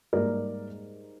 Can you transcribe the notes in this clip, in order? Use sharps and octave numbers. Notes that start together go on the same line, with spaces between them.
G#2 G3 A#3 A#4 D5